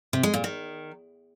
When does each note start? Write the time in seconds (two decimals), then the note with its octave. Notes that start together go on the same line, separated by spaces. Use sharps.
0.13 C3
0.23 G#3
0.34 A#2
0.44 D#3